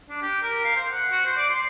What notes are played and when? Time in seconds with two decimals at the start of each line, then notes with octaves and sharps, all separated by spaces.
0.10 D4
0.22 G4
0.42 A#4
0.64 F5
0.76 C5
0.92 F#5
1.12 F#4
1.26 C5
1.37 D5
1.49 C6